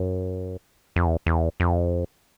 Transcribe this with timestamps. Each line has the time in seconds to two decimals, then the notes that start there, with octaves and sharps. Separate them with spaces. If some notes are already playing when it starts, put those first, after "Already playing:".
Already playing: F#2
0.96 F2
1.06 E2
1.26 E2
1.60 F2